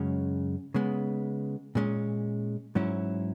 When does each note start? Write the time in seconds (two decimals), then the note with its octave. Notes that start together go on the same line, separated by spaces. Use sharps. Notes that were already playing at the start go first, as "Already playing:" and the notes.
Already playing: F#2 C#3 G#3 C#4
0.74 C#3 G#3 B3
1.75 A#2 G#3 C#4
2.75 G#2 F#3 C#4 E4